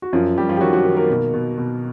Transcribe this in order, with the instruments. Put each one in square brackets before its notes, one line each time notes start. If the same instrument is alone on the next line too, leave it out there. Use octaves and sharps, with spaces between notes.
[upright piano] F#4
F#2 F3 F4
F#2 G3 G4
F3 F4
G4
D#3 F#3 F#4
F#3 F#4
D#3
A#3 A#4
B2
B2
B2